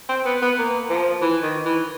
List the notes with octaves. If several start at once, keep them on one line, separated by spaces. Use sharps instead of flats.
C4
B3
B3
A#3
F3
E3
D#3
E3